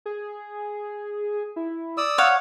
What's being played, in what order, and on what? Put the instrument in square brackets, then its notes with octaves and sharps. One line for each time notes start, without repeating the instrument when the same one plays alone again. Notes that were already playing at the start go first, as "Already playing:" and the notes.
[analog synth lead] G#4
E4
[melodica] D5 D#6 E6
[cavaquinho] C#5 F5 F#5 [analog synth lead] G#6